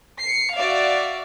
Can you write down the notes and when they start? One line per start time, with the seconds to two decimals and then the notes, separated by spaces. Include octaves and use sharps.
0.22 C7 C#7
0.55 F#4 D5 E5 F5